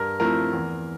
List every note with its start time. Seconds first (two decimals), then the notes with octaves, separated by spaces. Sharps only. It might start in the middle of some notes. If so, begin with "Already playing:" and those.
Already playing: G2 A#4
0.20 F3 A3 C4 E4 A#4
0.53 E2